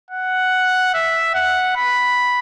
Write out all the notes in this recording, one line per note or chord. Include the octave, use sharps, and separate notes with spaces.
F#5
E5
F#5
B5